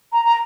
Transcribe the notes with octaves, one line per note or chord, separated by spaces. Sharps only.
A#5
A#5